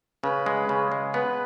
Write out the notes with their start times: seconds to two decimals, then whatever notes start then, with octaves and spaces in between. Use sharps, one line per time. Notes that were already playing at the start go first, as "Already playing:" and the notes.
0.24 C#3 B4
0.46 G#3
0.69 C#3
0.92 G#3
1.14 B3 B4